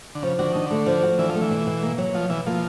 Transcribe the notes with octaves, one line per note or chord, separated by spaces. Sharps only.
D3
C#3 F3
D3 F#4
D#3 D4
D3 A3
F3
F#4
E3 D4
F3
A3
E3
B2
B2
A#3
F#3
B2 F3
B2 E3
F3 A#3